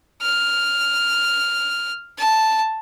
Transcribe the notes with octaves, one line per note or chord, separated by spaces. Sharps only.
F6
A5